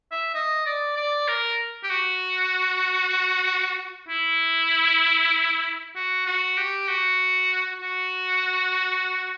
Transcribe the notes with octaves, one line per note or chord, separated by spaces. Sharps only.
E5
D#5
D5
D5
A#4
G4
F#4
E4
F#4
F#4
G4
F#4
F#4